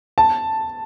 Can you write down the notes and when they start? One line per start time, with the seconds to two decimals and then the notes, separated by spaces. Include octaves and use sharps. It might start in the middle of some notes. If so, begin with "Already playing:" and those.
0.18 A5